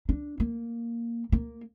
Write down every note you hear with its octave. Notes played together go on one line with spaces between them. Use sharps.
D4
A#3
A#3